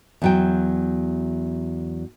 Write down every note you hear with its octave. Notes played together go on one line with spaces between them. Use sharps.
E2 F#3 G5